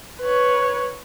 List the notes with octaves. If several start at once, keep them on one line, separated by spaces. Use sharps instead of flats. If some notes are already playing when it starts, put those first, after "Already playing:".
B4 C#5